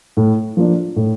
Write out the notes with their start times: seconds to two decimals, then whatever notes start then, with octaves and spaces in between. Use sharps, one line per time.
0.17 A2
0.57 F3 A#3 D4
0.96 A2